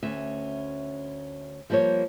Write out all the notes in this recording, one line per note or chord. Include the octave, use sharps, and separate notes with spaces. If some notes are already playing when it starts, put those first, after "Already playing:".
D2 C#4 E5
F3 G3 A#3 C5 C#5